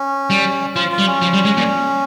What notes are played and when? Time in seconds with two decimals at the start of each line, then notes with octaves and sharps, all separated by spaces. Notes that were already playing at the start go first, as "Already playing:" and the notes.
Already playing: C#4
0.30 G3
0.76 F3 F4
0.92 F4
0.99 G3
1.07 C#4
1.22 F3
1.34 G3
1.45 G#3
1.58 A#2